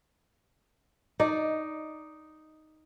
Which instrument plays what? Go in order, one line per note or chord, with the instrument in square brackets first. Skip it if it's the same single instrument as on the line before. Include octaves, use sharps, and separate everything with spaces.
[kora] D#4 D5